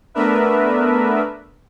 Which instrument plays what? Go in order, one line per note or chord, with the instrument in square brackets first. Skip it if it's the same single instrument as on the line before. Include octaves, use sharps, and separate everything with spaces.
[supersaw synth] A3 B3 D4 A#4 B4 E5